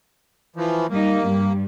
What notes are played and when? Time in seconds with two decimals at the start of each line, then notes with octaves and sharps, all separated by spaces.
0.56 E3 F3
0.89 G3 A#3 D#4
1.27 G2 G3